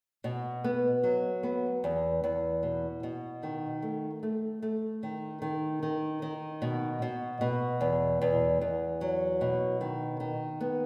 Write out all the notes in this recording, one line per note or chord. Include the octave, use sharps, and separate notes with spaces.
B2
B3
F#3
B3
E2
E2
B2
B2
D#3
A3
A3
A3
D#3
D#3
D#3
D#3
B2
B2
B2
E2
E2
E2
F#3
B2
D#3
D#3
B3